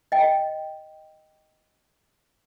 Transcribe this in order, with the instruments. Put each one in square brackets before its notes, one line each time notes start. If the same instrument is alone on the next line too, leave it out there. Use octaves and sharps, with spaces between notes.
[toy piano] D#5 G5